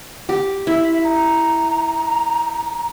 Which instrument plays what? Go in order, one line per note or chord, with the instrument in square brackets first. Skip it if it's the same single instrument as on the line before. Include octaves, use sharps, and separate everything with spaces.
[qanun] G4
[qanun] E4 [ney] E5
[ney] A#5